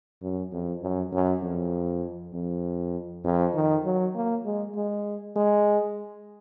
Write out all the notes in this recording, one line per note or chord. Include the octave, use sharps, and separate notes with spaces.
F#2
F2
F#2
F#2
F2
F2
F2
D#3
F#3
A#3
G#3
G#3
G#3